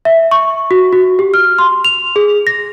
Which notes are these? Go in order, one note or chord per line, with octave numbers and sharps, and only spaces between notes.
E5
C#6
F#4
F#4
G4
F6
C6
F7
G#4
A#6